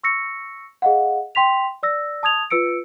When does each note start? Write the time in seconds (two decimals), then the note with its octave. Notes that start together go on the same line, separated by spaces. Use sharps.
0.03 C#6 E6 A#6 C#7
0.82 G#4 D#5 F5 F#5
1.35 G5 C6 B6 F7
1.83 D5 E6 A#6
2.23 A5 D#6 G#6 F7
2.50 F4 B4 E6 C#7 D7